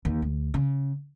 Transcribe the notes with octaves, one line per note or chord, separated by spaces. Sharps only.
D#2
D2
C#3